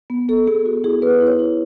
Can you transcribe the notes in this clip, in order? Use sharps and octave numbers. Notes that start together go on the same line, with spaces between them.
B3
B3 A4
B3 G#4
B3 F#4
E4 G#4
B3 B4
E4
C#5
E4